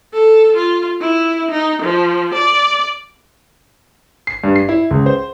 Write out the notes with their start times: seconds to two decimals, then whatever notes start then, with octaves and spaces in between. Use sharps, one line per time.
0.14 A4
0.56 F4
1.01 E4
1.51 D#4
1.82 F3
2.34 D5
4.27 C7
4.44 G2
4.56 C7
4.69 E4
4.91 C#2
5.06 C5